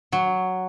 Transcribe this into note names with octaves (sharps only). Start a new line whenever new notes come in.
F#3